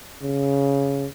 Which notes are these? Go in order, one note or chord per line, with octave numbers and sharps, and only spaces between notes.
C#3